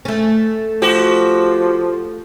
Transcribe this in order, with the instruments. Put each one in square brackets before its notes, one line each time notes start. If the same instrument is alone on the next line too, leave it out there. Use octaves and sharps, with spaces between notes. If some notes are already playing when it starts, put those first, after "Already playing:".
[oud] A3 C#4
[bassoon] F3 [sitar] F#4 G4